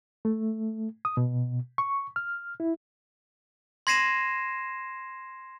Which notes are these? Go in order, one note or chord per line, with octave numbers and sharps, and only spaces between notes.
A3
D#6
B2
C#6
F6
E4
C6 G#6 A#6 C7 D#7 E7